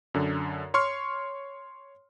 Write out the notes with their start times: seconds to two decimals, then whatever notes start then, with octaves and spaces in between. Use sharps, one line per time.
0.14 F#2 D3
0.74 C#5 C6 C#6 F6